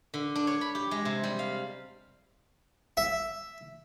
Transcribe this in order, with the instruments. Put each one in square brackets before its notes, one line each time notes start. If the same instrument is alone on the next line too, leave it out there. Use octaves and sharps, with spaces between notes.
[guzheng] D3
D4
C#5
B5
G4
G#3
C3
G3
F5
[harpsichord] E5